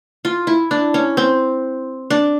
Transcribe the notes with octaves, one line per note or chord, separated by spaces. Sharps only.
F4
E4
D4
C#4
C4
D4